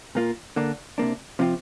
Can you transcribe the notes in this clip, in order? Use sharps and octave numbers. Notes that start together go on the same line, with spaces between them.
A#2 A#3 F4
D3 A#3 D4
C3 A#3 D4
C3 F3 C4 F4